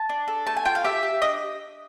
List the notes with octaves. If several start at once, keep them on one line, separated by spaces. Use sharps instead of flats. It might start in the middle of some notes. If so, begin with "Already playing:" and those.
Already playing: A5
D4
A4
A3 A5
G#5
F4 G5
F5
G4 E5
G4
D4 D#5